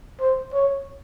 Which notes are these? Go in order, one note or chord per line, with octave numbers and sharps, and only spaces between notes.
C5
C#5